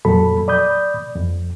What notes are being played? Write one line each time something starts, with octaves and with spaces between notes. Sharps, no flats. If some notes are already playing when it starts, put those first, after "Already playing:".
F2 A#2 F#3 A4 B5
D5 B5 D#6 G6
F2